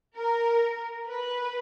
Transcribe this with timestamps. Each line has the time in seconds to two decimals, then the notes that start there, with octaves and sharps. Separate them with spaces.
0.16 A#4
1.08 B4